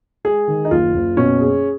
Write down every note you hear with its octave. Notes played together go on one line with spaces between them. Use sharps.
G#3 G#4
D#3
D#4
F#1 F4
F#1
B2 C#4
G#4